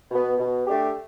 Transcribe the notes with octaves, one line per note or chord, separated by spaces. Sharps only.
B2 B3
B2
A3 D4 G4